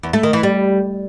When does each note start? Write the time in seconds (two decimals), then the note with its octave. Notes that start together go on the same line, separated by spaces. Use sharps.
0.03 E2
0.13 A3
0.23 D#3
0.33 E3
0.43 G3